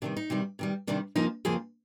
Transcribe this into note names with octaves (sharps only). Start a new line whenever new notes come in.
C3 D#3 G3 D4
D#4
C3 D#3 G3
C3 D#3 G3
C3 D#3 G3 D4
F2 C#3 F3 A#3 D#4
F2 C#3 F3 A#3 G#4